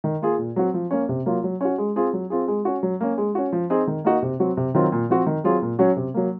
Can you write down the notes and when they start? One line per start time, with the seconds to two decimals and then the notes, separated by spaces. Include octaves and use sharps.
0.04 D#3
0.22 A#3 F4 G#4
0.38 A#2
0.56 F#3 C4 F#4
0.74 F3
0.91 A#3 C#4
1.09 C3
1.26 F#3 A#3 F4
1.44 F#3
1.61 C#4 F#4
1.78 G#3
1.96 C4 F4 G#4
2.13 F#3
2.30 C4 F4 G#4
2.48 G#3
2.65 C#4 F#4
2.83 F#3
3.01 A#3 C#4
3.18 G#3
3.35 C#4 F#4
3.52 F3
3.70 C4 D#4 G#4
3.87 D#3
4.04 A#3 D#4 F#4
4.22 C3
4.40 F#3 C4 F#4
4.57 C3
4.74 D#3 F#3 C4 F4
4.92 A#2
5.10 F3 C4 F#4
5.26 D#3
5.44 F#3 C4 F4 G#4
5.62 A#2
5.79 F#3 C#4 F#4
5.96 C3
6.14 F#3 A#3